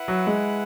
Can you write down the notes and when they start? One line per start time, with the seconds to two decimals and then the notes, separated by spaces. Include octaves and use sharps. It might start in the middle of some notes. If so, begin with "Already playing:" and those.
Already playing: E4 B4 F#5
0.08 F#3
0.27 G#3